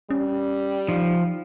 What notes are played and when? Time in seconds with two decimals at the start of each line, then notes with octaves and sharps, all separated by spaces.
0.10 G3 C#4
0.89 F3 D#4